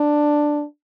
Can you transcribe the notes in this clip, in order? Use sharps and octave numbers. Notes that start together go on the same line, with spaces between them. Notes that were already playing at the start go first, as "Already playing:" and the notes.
Already playing: D4